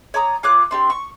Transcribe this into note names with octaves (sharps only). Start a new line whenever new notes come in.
C#5 D5 A#5 D#6
F4 C#5 D6 F#6
C4 D4 G4
C#6